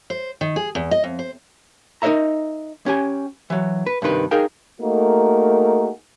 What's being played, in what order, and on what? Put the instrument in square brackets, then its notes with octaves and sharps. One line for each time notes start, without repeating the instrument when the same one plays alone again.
[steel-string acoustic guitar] C5
D#3
G#4
E2
D#5
F2
C5
[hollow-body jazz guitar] D#4 A#4 C5 D#5 E5 A#5
C#4 G4 G#5
E3 F#3
B4
G2 C3 D#3 B4
D#4 G#4 A#4 F5 G5
[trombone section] A3 A#3 D#4 F#4 G#4 A#4